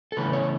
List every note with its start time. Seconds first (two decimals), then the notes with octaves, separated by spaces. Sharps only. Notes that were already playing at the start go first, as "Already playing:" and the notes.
0.12 A4
0.17 C#3 E3 A3 C#4 B4
0.33 C#5